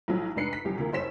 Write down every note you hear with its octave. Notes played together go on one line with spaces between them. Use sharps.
B1 A2 F3 F#3
F1 G#2 D4 B4 C7 C#7
B6
G1 C2 F#2 G4
D2 F3 A#3
F#1 C5 C#5 B6 E7